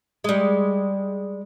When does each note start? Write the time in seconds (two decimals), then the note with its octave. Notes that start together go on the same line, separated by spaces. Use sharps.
0.24 G3 G#3